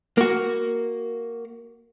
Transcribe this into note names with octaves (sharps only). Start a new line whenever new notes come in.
A#3 F#4